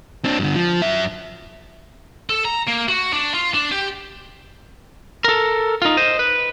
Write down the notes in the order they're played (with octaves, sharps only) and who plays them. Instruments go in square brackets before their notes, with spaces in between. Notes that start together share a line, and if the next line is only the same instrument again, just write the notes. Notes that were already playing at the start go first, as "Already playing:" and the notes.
[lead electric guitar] C4 D4
G2 D3
F3
F#2 E5
[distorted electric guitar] A4
A#5
A#3
F#4
D4
F4
D4
G4
[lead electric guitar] A4 A#4
D#4 F4
C5 D#5
B4